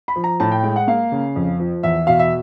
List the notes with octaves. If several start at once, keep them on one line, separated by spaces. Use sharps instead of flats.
B5
F3
A#5
A2 A5
G5
G#3 G5
F#5
A#3 F5
C#3
F2
F3
E2 E5
B2 F5
E5